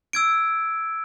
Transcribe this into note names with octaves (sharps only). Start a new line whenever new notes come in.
E6 G#6 D7